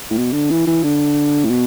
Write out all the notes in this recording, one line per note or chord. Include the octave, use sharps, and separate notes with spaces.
A2
B2
D3
E3
E3
D3
A2
B2